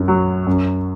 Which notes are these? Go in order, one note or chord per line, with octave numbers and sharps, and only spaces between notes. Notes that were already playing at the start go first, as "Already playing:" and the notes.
Already playing: F#2
F#3
F#2